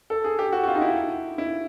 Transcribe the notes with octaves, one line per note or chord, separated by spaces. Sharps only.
A4
G#4
G4
F#4
F#4
F4
D#4
E4
E4